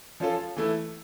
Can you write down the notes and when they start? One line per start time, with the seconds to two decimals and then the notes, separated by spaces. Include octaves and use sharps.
0.20 F3 C#4 F4 A4
0.56 E3 A3 E4